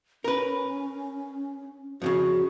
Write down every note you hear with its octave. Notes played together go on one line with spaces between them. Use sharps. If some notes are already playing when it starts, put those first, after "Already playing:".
C#4 A#4 B4
F2 A2 C#3 F#4